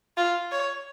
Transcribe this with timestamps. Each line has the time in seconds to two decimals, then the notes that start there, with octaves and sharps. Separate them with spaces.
0.17 F4
0.52 C#5